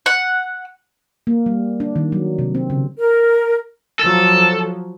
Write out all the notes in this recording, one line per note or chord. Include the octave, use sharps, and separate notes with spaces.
F#5
A#3
G3
D4
D#3
F#3
C3
C4
C#3
A#4
F3 F#3 A4